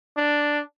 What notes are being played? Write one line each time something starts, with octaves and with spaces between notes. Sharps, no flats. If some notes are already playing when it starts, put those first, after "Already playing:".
D4